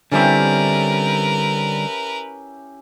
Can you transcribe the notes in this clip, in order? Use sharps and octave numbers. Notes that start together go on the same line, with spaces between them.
D3 G3 C4 C#4 E4 G4 A#4 B4